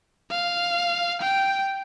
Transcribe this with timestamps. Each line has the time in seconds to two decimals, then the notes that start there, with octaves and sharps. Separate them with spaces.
0.31 F5
1.21 G5